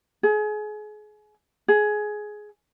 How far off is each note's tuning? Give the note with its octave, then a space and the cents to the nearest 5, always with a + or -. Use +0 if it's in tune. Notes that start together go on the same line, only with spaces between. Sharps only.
G#4 +30
G#4 +15